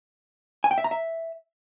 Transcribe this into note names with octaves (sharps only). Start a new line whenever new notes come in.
G#5
G5
E5
A#5
E5